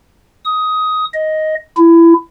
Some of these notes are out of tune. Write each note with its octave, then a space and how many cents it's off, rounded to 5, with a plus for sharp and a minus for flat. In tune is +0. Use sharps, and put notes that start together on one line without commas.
D#6 +15
D#5 +5
E4 +20